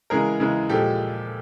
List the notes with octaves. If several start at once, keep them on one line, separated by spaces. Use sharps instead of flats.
C#3 E3 G#3 G#4 A#4
C#3 E3 G#3
A#2 F3 G#3 G4 A4